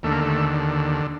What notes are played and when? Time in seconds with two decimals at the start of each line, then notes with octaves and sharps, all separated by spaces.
0.03 D#2 D3 A3
0.12 A#3
0.21 A3